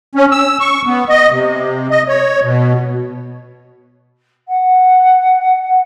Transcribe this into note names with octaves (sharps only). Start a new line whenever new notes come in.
C#4
E6
C#6
B3
D#5
C3
D#5
C#5
B2
F#5